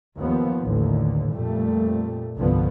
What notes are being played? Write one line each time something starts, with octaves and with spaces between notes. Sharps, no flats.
D#2 F3 B3
A1 D#2 D3
F2 A#2 G3 A3
C2 G2 D3 F3 B3